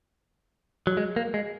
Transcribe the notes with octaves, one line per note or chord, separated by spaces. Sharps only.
F#3
G#3
A#3
G#3